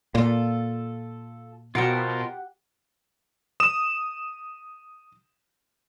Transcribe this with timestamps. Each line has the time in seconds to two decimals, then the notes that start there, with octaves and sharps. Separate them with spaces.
0.15 A#2 F4 A4
1.75 B2 F4 G4 A#4 C5 F#5
3.60 D#6 E7